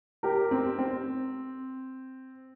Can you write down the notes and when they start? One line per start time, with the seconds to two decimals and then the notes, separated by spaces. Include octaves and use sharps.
0.23 G4 A#4
0.51 C4
0.79 C4